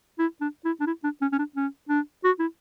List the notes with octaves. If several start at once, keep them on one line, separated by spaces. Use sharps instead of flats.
E4
D4
E4
D4
E4
D4
C#4
C#4
D4
C#4
D4
F#4
E4